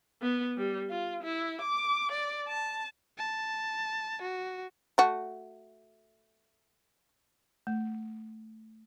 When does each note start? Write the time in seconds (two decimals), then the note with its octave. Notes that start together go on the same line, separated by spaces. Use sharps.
0.22 B3
0.57 G3
0.90 F4
1.23 E4
1.61 D6
2.12 D5
2.48 A5
3.18 A5
4.22 F#4
4.98 A3 F#4
7.67 A3